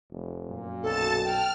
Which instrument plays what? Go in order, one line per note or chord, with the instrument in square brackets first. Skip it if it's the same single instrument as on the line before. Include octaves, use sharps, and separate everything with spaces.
[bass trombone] F1
[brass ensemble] F#2 A#2
[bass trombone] B1 [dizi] A4 [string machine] A5 A6
[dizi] G5 [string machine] F6